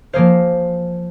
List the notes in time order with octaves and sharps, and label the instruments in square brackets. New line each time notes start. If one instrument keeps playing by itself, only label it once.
[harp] F3 A#3 G#4 C5 F5